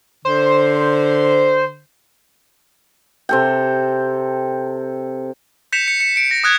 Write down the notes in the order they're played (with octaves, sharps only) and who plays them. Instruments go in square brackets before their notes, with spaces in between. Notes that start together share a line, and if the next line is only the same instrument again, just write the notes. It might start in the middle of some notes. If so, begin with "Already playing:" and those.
[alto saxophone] D3 [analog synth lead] C5
[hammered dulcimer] C3 A4 G5
[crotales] G6 B6 C#7 E7 F7
C#7
C#7
C#7 D7
A#6
D#6 F#6 G#6